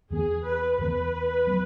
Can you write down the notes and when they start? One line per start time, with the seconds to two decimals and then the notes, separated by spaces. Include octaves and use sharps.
0.10 E2 E3 B3 G#4
0.45 B4
0.78 E2 E3 B3 B4
1.47 F#3 B3